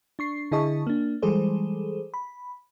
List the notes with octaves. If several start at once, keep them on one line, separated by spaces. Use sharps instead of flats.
D4 C#6 C7
D3 E4 G#4 D#5 A5 C#6
A#3 D4
E3 G3 G#3 G#4 A4 C5
B5